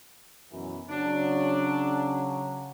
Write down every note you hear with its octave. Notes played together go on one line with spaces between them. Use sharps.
F#2 B2 E3
C#3 F#3 D4